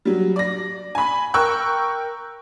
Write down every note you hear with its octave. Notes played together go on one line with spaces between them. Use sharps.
F#3 G3
D5 A#6
G#5 B5
A#4 G5 C#6 E6 F#6